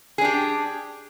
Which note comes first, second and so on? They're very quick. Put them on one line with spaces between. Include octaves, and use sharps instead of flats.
G#4 D4 G4